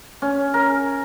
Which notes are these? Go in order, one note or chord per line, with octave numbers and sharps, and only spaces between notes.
C#4
A#4